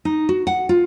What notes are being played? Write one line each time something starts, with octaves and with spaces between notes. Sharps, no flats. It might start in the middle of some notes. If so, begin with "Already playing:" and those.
D#4
F#4
F#5
F4